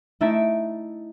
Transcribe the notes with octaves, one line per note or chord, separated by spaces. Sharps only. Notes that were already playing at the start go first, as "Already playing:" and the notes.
A3 D#4 E4 E5 A6 D7